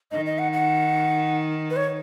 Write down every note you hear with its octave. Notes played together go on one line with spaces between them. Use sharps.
D#3 D#5
D#5
F#5
F#5
B4
C#5